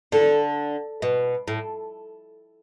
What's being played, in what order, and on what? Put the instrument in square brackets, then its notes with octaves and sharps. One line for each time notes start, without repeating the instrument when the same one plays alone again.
[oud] D3 [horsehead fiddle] A4
[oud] B2
A2